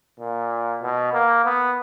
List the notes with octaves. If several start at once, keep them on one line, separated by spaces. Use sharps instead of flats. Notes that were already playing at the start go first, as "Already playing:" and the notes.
A#2
B2
A#3
B3